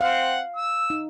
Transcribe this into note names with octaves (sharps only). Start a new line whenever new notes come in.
C4 F5 F#5
E6
D#4